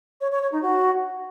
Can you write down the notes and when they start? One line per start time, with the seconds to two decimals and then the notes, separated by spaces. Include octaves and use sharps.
0.21 C#5
0.31 C#5
0.41 C#5
0.52 D#4
0.62 F#4